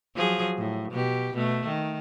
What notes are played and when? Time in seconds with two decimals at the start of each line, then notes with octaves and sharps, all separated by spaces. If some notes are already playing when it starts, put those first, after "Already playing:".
0.16 F3 F#3 G#4
0.58 A2
0.91 B2 G4
1.34 B2 A3
1.66 D#3